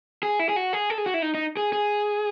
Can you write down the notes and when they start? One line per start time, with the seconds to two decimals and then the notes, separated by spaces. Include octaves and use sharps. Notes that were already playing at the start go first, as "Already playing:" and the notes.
0.23 G#4
0.39 E4
0.49 G#4
0.56 F#4
0.73 G#4
0.90 A4
0.98 G#4
1.06 F#4
1.14 E4
1.22 D#4
1.34 D#4
1.57 G#4
1.73 G#4